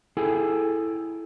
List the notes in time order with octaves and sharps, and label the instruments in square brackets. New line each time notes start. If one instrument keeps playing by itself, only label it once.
[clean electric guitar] E4 G#4 A4 G5 G#5